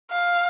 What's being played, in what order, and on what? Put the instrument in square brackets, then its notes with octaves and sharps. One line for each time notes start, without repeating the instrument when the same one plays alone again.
[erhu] F5